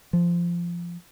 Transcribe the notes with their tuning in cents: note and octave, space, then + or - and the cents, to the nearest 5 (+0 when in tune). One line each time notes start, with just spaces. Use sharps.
F3 -15